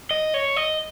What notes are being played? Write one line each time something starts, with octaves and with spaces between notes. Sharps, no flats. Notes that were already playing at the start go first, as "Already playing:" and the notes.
D#5
C#5
D#5